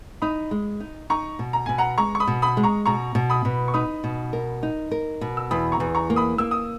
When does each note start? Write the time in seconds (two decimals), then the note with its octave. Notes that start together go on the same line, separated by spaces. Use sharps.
0.22 D#4 B5 D#6
0.51 G#3
0.80 D#4
1.10 D#4 A#5 C#6
1.39 B2
1.53 A#5
1.66 B2 G#5
1.78 F#5 A#5
1.98 G#3 A#5 C#6
2.15 C#6
2.20 B5 D#6
2.27 B2
2.42 B5 D#6
2.57 G#3
2.64 A#5 C#6
2.86 B2 A#5 C#6
3.15 B2
3.30 B5 D#6
3.45 B2
3.68 C#6
3.74 D#4 B5 D#6
4.04 B2
4.33 A#4
4.63 D#4
4.91 A#4
5.21 B2
5.37 E6
5.51 E2 B5 D#6
5.72 A#5 C#6
5.80 E2
5.95 A#5 C#6
6.10 A#3
6.16 B5 D#6
6.38 A#3 E6
6.51 D#6